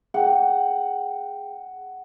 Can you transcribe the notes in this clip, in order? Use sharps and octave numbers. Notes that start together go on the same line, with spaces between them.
G#4 F#5 G5